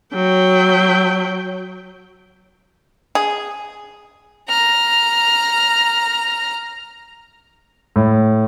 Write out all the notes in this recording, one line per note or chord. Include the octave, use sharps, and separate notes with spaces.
F#3 G5
G#4
A#5 F6
A2